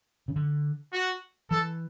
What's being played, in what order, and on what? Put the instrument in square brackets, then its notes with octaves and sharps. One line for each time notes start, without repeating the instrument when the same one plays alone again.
[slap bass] C#3
D3
[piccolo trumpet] F#4
[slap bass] E3 [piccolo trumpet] A4